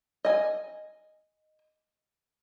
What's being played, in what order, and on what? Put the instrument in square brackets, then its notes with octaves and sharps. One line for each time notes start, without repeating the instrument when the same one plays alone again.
[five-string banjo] D#5 G#5